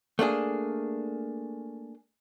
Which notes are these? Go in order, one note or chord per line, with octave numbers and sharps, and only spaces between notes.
A3 A#3 D4 G#4